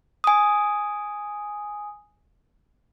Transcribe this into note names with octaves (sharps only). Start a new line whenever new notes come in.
G#5 D#6